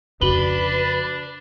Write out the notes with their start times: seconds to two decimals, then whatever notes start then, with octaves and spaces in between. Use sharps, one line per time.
0.21 F2 C#3 D4 F#4 B4 F#7 G7